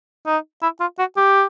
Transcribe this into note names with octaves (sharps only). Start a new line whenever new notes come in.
D#4
E4
F4
F#4
G4